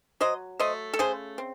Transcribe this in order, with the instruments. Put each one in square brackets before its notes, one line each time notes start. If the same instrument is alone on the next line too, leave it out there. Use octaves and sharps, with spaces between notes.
[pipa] F#3 C5 D#5
A3 C5 D#5
A4
C#3 G#4 C5
C4